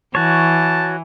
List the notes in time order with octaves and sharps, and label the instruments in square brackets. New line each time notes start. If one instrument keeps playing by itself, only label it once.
[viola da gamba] E3 [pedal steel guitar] F#4 C#5 [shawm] A5